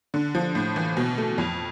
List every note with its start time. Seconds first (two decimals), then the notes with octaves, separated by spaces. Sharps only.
0.14 D3
0.35 F3
0.55 A2
0.76 E3
0.97 B2
1.18 A3
1.38 F2